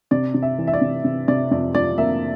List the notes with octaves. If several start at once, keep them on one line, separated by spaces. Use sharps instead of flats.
C3 D5
C3
E5
E3
E5
D5
C3
C3
C3 D5
F2 D5
F2 D5
A#3 E5